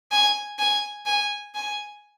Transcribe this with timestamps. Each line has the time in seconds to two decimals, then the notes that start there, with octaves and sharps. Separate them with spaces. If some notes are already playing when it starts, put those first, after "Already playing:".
0.12 G#5
0.59 G#5
1.06 G#5
1.55 G#5